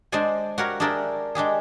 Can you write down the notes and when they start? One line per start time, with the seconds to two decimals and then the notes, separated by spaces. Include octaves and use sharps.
0.12 G#3 D4 G#4 C5 D5 G#5
0.58 F#4 G4 A#4 C#5 F5
0.80 D4 G4 G#4 A#4 D5 E5
1.35 G#3 D4 G4 G#4